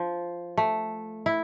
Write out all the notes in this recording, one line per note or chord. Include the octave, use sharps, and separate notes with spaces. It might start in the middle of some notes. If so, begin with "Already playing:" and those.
Already playing: F3
A3
E4